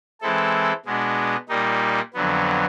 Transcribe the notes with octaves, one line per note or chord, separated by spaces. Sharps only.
E3 G#3 C4 E4 A4
B2 G#3 B3 D4
A#2 G3 A#3 D#4
F2 D3 F#3 B3